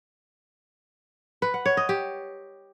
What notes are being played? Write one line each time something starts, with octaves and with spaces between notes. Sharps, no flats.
B4
F#5
C#5
D#5
G4